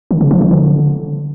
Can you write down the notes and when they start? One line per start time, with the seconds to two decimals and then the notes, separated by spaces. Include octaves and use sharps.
0.11 D#3
0.21 C#3
0.31 F3
0.41 F3
0.51 D3